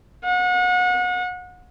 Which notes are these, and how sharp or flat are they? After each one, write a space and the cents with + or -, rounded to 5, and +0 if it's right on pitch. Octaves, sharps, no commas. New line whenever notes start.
F#5 -35